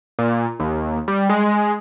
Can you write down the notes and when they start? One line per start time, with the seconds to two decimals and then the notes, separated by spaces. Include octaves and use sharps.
0.19 A#2
0.60 D#2
1.08 G3
1.29 G#3